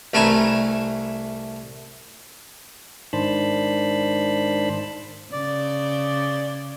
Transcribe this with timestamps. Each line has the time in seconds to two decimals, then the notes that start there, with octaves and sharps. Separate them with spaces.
0.14 C2 A3 A4 B4 G#5 A#5
3.13 G#2 D#3 D4 C5 A5 B5
5.33 C#3 D5